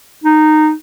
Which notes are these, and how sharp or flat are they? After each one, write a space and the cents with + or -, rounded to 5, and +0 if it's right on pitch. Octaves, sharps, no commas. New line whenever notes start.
D#4 -15